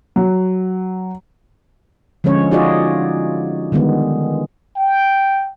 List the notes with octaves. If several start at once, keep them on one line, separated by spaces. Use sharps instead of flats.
F#3
D3 F3 G#3 C#4 C#5
D#4 F4 F#4 G#4 D5 D#5
D3 D#3 G3 G#3 B3
G5